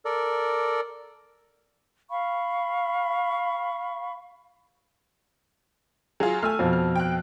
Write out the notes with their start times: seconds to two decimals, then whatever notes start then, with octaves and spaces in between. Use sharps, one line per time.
0.05 A4 A#4 D5
2.10 F5 B5 C#6
6.20 F#3 F4 G#4
6.43 A3 G#5 E6 F6
6.59 F2 B2 F3
6.73 F6
6.96 G5 F#6